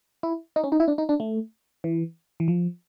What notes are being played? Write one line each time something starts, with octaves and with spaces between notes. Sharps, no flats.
E4
D#4
C#4
D#4
E4
D4
D#4
D4
A3
E3
E3
F3